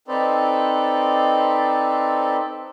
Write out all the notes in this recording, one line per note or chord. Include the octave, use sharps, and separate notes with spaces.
C4 D#4 A4 B4 C5 D5